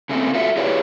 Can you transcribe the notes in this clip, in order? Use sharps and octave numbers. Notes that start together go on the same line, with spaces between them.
C#3 A3 A#3 C4
F4 F#4 A4 E5
E4 G4 G#4 B4 C#5 D5